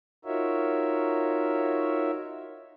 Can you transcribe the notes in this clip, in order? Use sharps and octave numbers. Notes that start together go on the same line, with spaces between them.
D#4 F4 F#4 A#4 C#5 E5